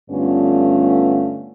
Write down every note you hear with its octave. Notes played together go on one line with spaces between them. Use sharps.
G2 D3 A3 B3 C#4 F4